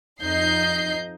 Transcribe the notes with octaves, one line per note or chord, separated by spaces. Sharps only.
F2 D#4 D#5 G6 C7